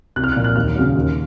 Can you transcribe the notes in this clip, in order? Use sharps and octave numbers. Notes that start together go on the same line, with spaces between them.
C2 F#6
F6
F#6
A#2 F3
F#6
D#2 F6
C#3 F#3
D#2